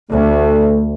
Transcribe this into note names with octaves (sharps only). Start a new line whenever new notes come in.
D2 A3